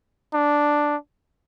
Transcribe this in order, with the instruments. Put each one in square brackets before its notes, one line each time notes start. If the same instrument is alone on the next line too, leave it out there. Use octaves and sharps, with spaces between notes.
[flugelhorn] D4